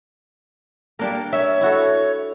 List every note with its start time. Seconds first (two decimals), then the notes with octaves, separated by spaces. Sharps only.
0.99 G3 A#3 D4 A#4
1.33 C#5 E5
1.61 E4 F#4 A4